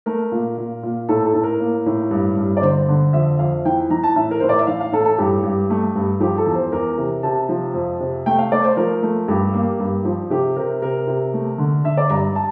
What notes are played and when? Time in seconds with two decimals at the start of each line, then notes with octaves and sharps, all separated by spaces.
0.06 A3 A#4
0.32 A#2
0.58 A#2
0.83 A#2
1.09 A2 A4
1.26 A4
1.34 A2
1.43 A#4
1.60 A#3
1.86 A2
2.11 G2
2.37 G2
2.57 D5
2.62 D3 C5
2.89 D3
3.13 F2 E5
3.39 F2 F5
3.65 E3 G5
3.90 E3 A#5
4.03 A5
4.16 A2 E5
4.31 A#4
4.40 A2 C5
4.49 D5
4.58 E5
4.67 E3 F5
4.81 F5
4.92 A2 A4
5.05 A4
5.18 G2 G4
5.44 G2
5.70 A3
5.96 G2
6.20 F3 G4
6.38 A4
6.47 E2
6.55 C5
6.72 E2 A#4
6.98 C3
7.23 C3 A5
7.49 F3
7.74 F2
8.00 C3
8.26 A3 G5
8.39 F5
8.52 A3 D5
8.64 C5
8.77 F3 A#4
9.03 A3
9.28 G2 G4
9.54 A#3
9.80 G2
10.05 F3
10.30 C3 G4
10.56 C3 A#4
10.82 C3 A#4
11.07 C3
11.34 A3
11.58 D3
11.84 D3 E5
11.97 D5
12.10 G2 A#5
12.36 A5